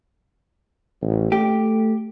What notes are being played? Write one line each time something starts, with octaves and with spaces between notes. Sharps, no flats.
A1
A3 G4